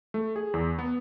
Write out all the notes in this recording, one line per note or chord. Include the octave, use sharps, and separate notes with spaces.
A3
G#4
E2
B3